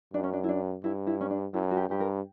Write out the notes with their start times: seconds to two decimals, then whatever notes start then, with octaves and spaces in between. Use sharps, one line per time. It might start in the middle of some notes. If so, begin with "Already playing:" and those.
0.13 F#2 D4
0.23 C#4
0.33 D4
0.44 E4
0.49 D4
0.84 G2 E4
1.07 E4
1.21 C#4
1.30 D4
1.53 F#2 E4
1.71 F#4
1.77 G4
1.89 G2 G4
2.00 A#4